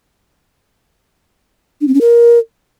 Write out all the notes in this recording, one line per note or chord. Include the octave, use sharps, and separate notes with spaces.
D4
C4
C#4
A#4